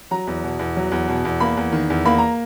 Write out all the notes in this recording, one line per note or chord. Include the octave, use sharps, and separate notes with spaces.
F#3 A#5
E2
B2
E2
F#3
E2
B2
E2
A#3 B5
E2
D#3
E2
A#3 B5
A#5